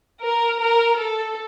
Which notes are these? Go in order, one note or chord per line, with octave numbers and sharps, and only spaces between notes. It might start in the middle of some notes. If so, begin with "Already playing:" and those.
A#4
A#4
A4